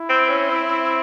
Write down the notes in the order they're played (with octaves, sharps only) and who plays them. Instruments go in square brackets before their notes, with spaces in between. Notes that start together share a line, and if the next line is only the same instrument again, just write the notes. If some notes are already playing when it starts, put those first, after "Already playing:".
Already playing: [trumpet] E4
[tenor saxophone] C4
C#4
C4